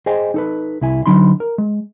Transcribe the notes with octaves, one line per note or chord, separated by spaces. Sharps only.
G#4 C5 D#5 G5 G#5
D#4 A4 B4
C2 E4 G#5
D3 F#3 D#4 B5 C6
A#4
G#3